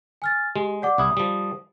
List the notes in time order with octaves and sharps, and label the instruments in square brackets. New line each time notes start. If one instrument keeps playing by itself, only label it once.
[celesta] G#5 F6 A6
[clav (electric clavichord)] G#3 [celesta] G4
[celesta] D5 F#5 D6
[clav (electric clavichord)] C2 E4 [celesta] D#6
[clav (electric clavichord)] F3 G3